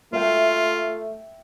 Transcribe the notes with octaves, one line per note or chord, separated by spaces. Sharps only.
A3 F4 E5 G5